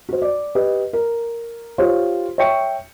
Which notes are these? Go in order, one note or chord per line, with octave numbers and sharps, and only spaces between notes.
F#4 C5
D5
G4 B4 D#5
A#4
F4 G4 C5 C#5
C#5 E5 G5 C#6 C#7